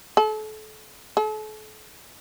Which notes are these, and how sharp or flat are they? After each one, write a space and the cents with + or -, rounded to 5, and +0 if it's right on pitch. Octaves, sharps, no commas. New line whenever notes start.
A4 -35
A4 -40